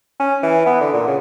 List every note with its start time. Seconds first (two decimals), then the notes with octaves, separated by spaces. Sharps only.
0.20 C#4
0.43 E3
0.66 B3
0.81 D3
0.93 A#2
1.07 C#3